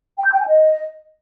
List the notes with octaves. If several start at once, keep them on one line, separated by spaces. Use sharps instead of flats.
G5
G6
G5
G#5
D#5